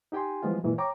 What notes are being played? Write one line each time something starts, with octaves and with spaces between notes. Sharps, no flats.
D#4 G4 G5 G#5 C6
E3 F3 G3 G#3 B3 F4
F#2 A#2 E3 G#3
C#5 G5 A#5 D6